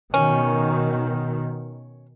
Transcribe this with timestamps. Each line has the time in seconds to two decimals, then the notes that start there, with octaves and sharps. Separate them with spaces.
0.14 B2 D#3 C#4